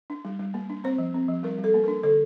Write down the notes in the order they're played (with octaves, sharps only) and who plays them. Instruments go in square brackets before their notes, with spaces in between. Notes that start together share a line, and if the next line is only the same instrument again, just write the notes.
[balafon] D4
G3
G3
A#3
D4
C4 C5
F3
C4
F3
G3 A#4
G3
A4
A#3
A#4
D4
D3 A4